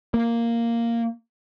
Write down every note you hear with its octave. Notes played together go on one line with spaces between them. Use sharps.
A#3